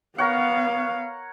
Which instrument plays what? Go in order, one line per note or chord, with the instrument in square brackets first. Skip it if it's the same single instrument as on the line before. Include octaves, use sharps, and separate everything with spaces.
[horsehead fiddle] B3 F5 [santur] A#4 C#5 F#5